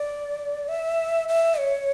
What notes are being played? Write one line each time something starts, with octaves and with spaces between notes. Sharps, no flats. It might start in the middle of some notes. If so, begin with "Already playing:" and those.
Already playing: D5
E5
E5
C#5